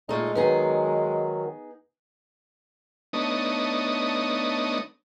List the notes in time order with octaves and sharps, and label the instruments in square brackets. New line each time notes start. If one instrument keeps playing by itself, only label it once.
[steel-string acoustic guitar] A#2 A3 D#4 [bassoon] G#3
[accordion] D#3 F#3 [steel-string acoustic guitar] B3 D#4 G#4 [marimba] B4
[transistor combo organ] A3 B3 D4 D#4 C#5 D#5